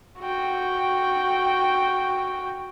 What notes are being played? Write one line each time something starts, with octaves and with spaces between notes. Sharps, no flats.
F#4 G5